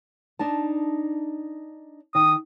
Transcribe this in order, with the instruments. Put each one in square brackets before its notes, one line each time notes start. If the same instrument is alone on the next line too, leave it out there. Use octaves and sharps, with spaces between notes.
[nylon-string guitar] D4 D#4 A5
[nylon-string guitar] D#3 [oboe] D#6